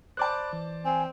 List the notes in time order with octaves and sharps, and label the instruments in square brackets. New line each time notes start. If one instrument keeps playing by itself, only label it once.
[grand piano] C5 D5 A5 [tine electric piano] B5 D6 F#6
[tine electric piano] E3
[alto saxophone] C4 [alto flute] G#5